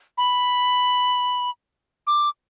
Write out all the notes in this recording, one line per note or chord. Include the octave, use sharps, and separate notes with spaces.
B5
D6